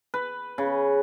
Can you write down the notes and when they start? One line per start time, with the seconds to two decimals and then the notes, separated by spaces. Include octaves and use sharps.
0.14 B4
0.58 C#3